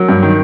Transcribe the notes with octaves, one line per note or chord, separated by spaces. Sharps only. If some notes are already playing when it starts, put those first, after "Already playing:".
Already playing: F#3 A#4
G2
D#3